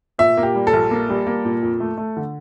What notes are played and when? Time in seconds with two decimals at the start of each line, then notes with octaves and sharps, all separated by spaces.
0.19 A#2 E5
0.37 A#3
0.43 G4
0.55 G3
0.67 A4
0.73 A#1
0.91 A#3
1.09 G3
1.27 A#3
1.45 A#2
1.62 F2
1.80 A3
1.98 A3
2.17 D3